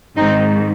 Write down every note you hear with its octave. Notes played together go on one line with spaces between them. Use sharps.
G#2 D#3 C4 D#4